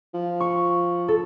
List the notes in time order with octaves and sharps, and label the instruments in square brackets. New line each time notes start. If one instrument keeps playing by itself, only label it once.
[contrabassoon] F3
[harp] C#6
A4